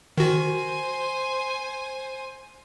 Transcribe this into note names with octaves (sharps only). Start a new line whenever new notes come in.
D#3 F#4 C5 G#5